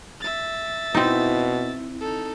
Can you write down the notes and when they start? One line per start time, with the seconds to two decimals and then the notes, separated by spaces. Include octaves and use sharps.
0.21 E5 A6
0.95 B2 C4 D#4 E4
2.01 D#4 A4